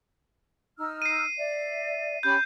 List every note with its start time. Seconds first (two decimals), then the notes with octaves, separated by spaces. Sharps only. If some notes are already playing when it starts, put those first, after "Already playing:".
0.79 D#4 E6 F6
1.02 C7 D#7
1.38 D5 E5
2.23 C#4 G4 B5 G6